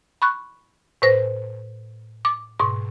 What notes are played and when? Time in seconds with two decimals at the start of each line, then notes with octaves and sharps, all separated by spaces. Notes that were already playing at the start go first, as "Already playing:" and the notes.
0.22 B5 C#6 F#6
1.02 A2 B4 C5 A#6
2.25 D6
2.59 G#2 B2 C#6